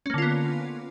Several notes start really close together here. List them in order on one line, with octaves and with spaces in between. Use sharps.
C#4 A#3 D3 F4 B3